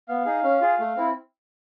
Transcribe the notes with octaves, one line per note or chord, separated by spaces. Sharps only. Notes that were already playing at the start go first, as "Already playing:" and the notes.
B3 F5
D#4 G#4
C#4
F4 G#4
A3
C4 E4